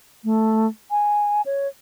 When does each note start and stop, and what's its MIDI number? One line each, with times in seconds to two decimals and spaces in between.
0.24 0.67 57
0.91 1.42 80
1.46 1.68 73